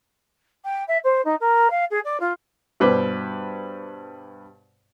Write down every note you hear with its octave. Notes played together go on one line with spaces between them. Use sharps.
G5
E5
C5
D#4
A#4
F5
G#4
D5
F4
G2 B2 B4 C5 D6